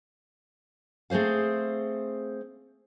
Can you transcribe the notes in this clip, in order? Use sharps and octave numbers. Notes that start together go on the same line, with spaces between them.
A3 C4 G#4 C5 F5